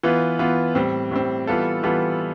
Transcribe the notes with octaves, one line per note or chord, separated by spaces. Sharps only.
E3 B3 F4
E3 B3 F4
A2 G3 C4
A2 G3 C4
E3 G3 B3 F4 A4
E3 G3 B3 F4 A4